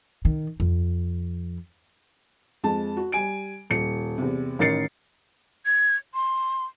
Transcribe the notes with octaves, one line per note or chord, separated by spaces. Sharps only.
D#3
F2
F2 G#3 A5
F#4
G3 G#5 D7
D#1 C#7
E2 C3
A1 D#3 A#4 A6 C7 C#7
G#6
C6